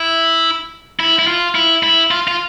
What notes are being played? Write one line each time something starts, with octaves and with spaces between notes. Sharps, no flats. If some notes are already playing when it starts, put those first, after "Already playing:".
Already playing: E4
E4
E4
F4
E4
E4
F4
F4